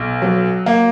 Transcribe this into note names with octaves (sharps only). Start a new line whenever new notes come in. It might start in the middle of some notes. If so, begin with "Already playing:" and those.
Already playing: B1
F#3
A#3